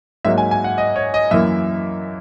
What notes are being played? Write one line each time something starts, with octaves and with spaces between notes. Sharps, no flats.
G#2 F#3 A#3 E5
G#5
G#5
F#5
D#5
C#5
D#5
F#2 E3 A#3 E5